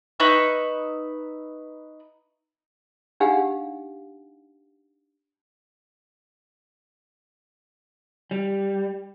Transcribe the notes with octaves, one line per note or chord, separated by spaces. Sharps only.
D#4 B4 E5 C#6
D4 D#4 G4 F5 F#5 G#5
G3